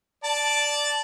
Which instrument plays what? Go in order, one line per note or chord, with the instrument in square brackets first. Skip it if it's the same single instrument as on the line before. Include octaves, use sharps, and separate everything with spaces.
[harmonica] D5 A5